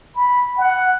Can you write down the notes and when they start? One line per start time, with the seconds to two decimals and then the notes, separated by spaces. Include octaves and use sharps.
0.15 B5
0.58 F#5